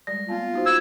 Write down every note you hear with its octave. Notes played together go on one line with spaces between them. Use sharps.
G3 G#3 D5 A#6
A#3 B3 F4 A5
D#4 F#4 C5
E6 G#6